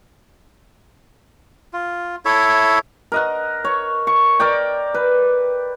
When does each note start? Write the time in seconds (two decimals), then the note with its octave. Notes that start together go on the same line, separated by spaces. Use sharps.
1.73 F4
2.25 E4 A4 C#5 E5
3.12 A#4 D#5 F#5
3.65 C#5
4.07 C#6
4.40 A#4 D5 G5
4.94 B4